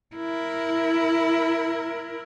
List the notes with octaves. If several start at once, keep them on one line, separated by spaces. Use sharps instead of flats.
E4 A#4